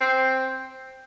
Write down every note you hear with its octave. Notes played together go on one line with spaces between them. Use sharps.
C4